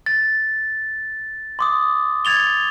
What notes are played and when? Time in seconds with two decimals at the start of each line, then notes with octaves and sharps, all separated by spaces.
0.06 A6
1.59 C6 D6 D#6
2.25 G#6 A6 F7 G7